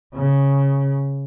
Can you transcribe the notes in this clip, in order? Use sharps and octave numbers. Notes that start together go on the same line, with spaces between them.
C#3